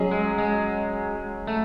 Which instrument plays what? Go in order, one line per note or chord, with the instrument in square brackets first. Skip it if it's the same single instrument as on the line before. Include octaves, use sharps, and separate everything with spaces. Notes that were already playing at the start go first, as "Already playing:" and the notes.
Already playing: [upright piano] F#3 C#4 G#4 D#5
[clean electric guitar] G#3
G#3
A3